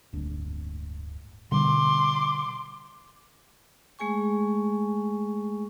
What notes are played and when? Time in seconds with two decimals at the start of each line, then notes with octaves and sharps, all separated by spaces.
0.13 D1 G1 D4
1.52 B2 D3 G3 C6 D6
3.99 G#3 A3 G#4 G#5 C#6